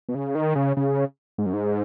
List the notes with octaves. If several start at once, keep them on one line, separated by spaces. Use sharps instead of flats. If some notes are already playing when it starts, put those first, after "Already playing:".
B2
C#3
D#3
C#3
C#3
G#2
F#2
G#2